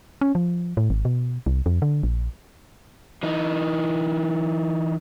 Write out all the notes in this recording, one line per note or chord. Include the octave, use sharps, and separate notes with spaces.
C#4
F3
A2
G#1
B2
C2
F2
D3
A#1
E3 D#4